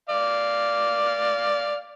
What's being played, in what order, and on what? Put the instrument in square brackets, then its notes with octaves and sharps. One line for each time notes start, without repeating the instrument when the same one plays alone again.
[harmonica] D5 F5